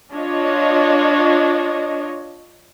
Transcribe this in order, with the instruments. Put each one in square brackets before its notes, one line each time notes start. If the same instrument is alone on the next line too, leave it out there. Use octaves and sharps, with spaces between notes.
[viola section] D4 F4 C#5 D#5